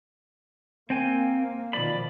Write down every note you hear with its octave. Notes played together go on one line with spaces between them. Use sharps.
A#3 C4 G5 G#5
B2 D#3 F3 D5 B5